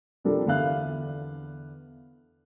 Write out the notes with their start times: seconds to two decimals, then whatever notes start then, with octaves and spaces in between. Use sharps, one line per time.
0.25 C3 F3 G3 D4 A4 A#4
0.46 E2 D3 B3 E5 F5 F#6